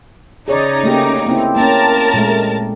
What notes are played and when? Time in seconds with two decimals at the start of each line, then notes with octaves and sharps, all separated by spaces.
0.48 C#3 D#4 G#4 C#5 D5
0.83 A3 A#3 G4
1.27 A#3 C4 E4
1.56 A#3 C#4 A#4 A5 A6
2.14 A#2 G#3 A3